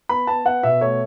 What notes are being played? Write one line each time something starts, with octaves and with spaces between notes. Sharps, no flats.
B3 B5
B3 A5
B3 F#5
B2 E5
A3 C#5